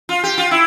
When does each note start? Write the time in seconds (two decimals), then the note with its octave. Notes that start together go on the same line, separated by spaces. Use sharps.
0.09 F4
0.23 G4
0.38 F4
0.51 E4